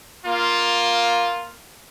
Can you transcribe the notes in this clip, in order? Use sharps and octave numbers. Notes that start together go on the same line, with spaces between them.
A#3 F4